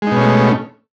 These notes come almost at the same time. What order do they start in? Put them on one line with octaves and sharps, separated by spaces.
G#3 D#4 B2 C#4 A3